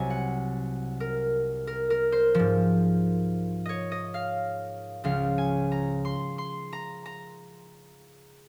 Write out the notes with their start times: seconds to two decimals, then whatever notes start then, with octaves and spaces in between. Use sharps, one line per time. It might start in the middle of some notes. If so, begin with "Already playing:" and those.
Already playing: C2 C3 F#3 G#5 A#5
0.10 F#5
1.00 A#4
1.67 A#4
1.90 A#4
2.12 C5
2.35 G#2 F3
3.66 C#5 D#5
3.92 D#5
4.14 F5
5.04 C#2 C#3 F3 F5
5.38 G#5
5.72 A#5
6.05 C6
6.38 C6
6.73 A#5
7.06 A#5